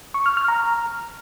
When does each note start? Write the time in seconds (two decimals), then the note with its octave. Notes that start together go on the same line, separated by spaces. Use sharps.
0.14 C#6
0.26 F6
0.37 F6
0.48 A#5